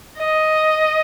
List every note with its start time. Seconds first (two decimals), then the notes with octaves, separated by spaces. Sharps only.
0.18 D#5